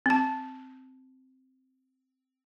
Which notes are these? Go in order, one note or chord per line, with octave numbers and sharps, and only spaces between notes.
C4 A5